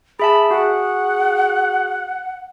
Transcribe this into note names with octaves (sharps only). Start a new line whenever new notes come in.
G#4 E5 A5 B5
F#4 G#4 F#5